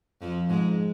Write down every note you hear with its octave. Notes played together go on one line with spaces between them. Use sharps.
F2 F3
G#2 G#3